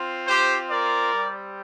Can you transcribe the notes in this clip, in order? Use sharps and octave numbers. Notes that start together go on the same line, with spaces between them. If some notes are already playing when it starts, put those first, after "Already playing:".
Already playing: C4 F4
G4 C5
A#4 D5
G3 C4 G4